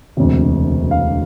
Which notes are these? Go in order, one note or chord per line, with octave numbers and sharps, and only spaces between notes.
E1 D2 C3
F5